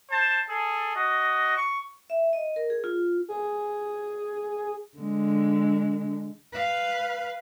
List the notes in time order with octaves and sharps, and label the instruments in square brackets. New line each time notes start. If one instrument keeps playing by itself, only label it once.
[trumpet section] C5 A5
G#4 A4
F#4 D#5
C#6
[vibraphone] E5
D#5
A#4
G#4
F4
[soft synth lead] G#4
[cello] D3 G#3
B4 F5